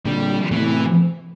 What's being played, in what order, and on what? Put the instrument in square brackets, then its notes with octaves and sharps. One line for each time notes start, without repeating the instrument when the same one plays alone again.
[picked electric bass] A#2 D3 [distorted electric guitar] G3
[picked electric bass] A2 C3 [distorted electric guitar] E3